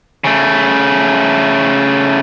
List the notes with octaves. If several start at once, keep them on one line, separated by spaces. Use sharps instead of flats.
C#3 A3